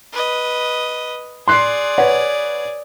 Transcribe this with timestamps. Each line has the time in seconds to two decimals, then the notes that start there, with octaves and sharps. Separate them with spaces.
0.13 B4 D#5
1.48 G#4 D5 C6 F#6 C7
1.98 B4 C#5 F#5